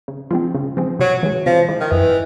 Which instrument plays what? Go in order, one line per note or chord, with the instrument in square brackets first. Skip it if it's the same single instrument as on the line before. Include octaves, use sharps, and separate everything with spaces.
[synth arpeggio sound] C#3
F3 G#3 C4
C#3
F3 G#3 C4
[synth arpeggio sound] C3 [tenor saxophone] F#3
[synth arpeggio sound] E3 G#3
[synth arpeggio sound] C3 [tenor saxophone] F3
[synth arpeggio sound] E3 G#3
[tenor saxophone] D#3
[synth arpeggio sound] F#2 [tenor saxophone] E3